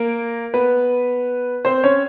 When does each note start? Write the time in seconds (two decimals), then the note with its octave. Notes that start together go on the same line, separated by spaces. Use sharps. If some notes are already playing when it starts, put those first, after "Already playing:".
Already playing: A#3 A#4
0.54 B3 B4
1.65 C4 C5
1.84 C#4 C#5